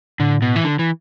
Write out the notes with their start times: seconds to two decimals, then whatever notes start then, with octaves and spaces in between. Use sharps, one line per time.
0.19 A2 D3
0.42 B2
0.56 E3
0.64 D3
0.79 E3